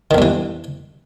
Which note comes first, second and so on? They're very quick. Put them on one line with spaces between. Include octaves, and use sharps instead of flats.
D#3 E2 G2 E3